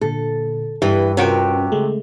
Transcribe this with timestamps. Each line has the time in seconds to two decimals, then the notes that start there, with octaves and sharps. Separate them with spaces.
0.01 A#2 D3 A4
0.82 G2 E3 G4
1.17 C3 C#4 F4 F#4 A#4 G5
1.72 C#3 G#3 A3